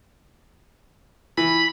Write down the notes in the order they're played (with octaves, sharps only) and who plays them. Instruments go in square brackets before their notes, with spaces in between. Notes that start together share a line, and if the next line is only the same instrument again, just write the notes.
[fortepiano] E3 [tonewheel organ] B5